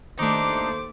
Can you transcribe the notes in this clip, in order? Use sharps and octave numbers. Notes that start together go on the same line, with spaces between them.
D#2 A3 D4 D#4 C5 D6